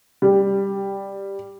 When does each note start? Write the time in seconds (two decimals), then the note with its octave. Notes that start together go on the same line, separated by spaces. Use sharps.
0.22 G3